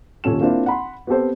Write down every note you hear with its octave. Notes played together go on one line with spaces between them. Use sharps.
D#1 A#2 C#4 A4 E7
A#3 C4 D4 E4 F4
F#5 B5 C6
B3 C4 G4 A4 C5